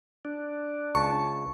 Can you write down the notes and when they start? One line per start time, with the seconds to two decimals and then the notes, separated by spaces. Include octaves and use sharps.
0.25 D4
0.95 C#2 A5 C#6